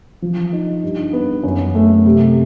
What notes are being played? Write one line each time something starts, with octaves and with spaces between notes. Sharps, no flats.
F3
D#4
G2
B3
F#2
A3
C3